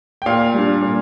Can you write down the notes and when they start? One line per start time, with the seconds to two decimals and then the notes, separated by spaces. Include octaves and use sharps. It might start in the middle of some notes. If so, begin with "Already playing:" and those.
0.22 G5
0.26 A#2 F5
0.54 G3 D4
0.82 A#2